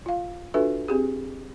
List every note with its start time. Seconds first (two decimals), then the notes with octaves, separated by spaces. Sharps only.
0.06 F4 F5
0.54 D4 F4 F#4 A4 B4 E5
0.88 C4 G4 G#4